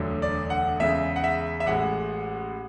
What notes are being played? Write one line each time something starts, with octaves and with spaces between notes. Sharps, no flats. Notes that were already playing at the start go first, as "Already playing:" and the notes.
Already playing: E1 D2 D3 F#3
D5
F#5
E2 C#3 G#3 E5
F#5
E5
E5
A1 A2 G#3 F#5